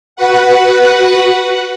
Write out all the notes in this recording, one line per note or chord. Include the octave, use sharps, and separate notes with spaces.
F#4 B4 F#5